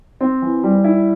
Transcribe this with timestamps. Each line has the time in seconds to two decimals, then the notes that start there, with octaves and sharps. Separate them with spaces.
0.21 C4
0.42 E3
0.63 G3
0.84 E4